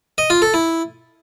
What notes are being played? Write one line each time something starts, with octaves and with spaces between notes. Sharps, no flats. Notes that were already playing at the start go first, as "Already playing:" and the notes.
D#5
F4
A4
E4